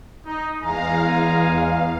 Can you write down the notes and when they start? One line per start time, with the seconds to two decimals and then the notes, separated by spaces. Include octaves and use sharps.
0.25 D#4
0.60 E2 G#3 F5 G#5 A#5